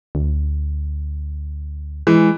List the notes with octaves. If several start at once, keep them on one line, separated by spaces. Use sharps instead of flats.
D2
E3 G#3